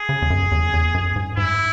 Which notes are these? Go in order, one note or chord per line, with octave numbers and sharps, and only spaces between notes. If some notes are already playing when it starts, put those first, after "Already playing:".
Already playing: G#4
C#3
E2
F#2
E2
E2
F#2
G#2
G#2 E4